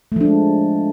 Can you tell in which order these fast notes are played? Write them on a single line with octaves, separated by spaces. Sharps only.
A3 F3 D4 G#3